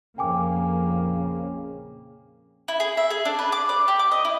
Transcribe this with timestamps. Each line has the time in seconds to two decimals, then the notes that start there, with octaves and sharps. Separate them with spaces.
0.18 A#1 F2 C#3 A#3 G5 G#5 D6
2.68 E4
2.80 G#4
2.97 E5
3.10 G#4
3.25 D4
3.39 B4
3.52 D6
3.69 D5
3.88 G4
3.99 D6
4.11 D#5
4.25 E4